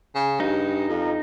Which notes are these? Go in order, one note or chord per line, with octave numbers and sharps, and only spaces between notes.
C#3
G2 D#4
F2